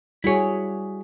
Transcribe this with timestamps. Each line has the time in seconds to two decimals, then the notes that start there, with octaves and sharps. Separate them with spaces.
0.24 G3 E4 F#4 G#4 C#5